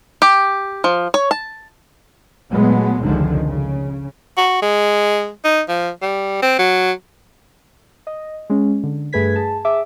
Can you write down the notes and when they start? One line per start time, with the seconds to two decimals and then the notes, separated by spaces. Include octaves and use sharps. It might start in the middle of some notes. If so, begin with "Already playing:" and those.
0.22 G4
0.84 F3
1.14 C#5
1.31 A5
2.51 A#2 F#3 G#3 A3 B3
3.01 F1 C#2 D3 D#3 F3 G#3
3.47 C#3
4.38 F#4
4.62 G#3
5.44 D#4
5.69 F3
6.02 G3
6.42 C4
6.59 F#3
8.07 D#5
8.50 G#3 C#4
8.84 D3
9.13 G2 A3 G#4 B4 G#6 B6
9.36 G#4 A5
9.65 G#4 E5 D6